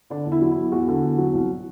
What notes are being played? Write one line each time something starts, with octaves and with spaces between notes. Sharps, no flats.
D3 D4
E2
E4
F#3
E4
E2
E2 F#4
D3
E2
F#3
C2